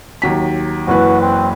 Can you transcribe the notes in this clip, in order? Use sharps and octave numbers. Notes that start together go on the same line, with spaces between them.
D#2 F#3 B6
F#1 E3 F#4 B4
C4